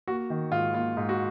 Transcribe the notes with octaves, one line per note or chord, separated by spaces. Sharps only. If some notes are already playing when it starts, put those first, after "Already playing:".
A#3 F#4
D#3
G#2 F4
A#3 F4
G#2
F#4